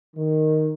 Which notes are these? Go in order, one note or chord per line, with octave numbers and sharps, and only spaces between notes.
D#3